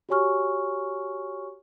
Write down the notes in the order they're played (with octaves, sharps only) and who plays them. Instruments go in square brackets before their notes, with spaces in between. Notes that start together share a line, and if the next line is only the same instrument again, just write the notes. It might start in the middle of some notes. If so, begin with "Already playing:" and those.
[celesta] F#4 G4 C#5 G#5 C#6 F6